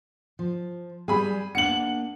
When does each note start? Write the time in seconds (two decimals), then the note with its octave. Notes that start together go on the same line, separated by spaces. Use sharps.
0.39 F3
1.08 G3 G#4 G#5 B5
1.55 A#3 D4 F#5 C#7 F#7